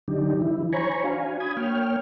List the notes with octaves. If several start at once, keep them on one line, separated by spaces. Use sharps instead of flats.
D3 F#3 D4 D#4 G4
E3 E4
C5 C#5 G#5 A#5 B5 C#6
D4 F#4 F5 G#5
B5 D#6 G#6
A#3 C#5 G5 F6